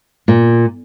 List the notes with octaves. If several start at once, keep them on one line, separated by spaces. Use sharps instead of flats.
A#2